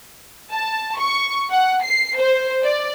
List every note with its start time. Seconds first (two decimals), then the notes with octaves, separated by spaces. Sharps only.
0.51 A5
0.99 C#6
1.50 F#5
1.82 C7
2.18 C5
2.64 D5